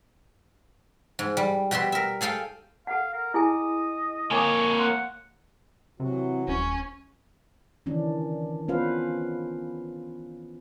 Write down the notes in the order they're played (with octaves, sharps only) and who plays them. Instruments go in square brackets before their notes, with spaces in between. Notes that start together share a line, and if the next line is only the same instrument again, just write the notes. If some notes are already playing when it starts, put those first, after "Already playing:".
[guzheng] G#2
G3
B2 G4 E5 C6
A#4 E5
G#4 A4 F5 G5
[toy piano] A4 F#5 [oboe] F5
[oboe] A#4
[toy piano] E4 G#4 G#5 [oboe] D#5
[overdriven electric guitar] A#3 C#5 [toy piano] G#5 D6
[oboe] F#5 [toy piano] C6
[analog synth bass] C3 [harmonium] E3 F#3 F#4
[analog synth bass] D#1 [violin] C#4
[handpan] D#3 E3 C#4 D4
B3 C#4 F4 B4 C5 F5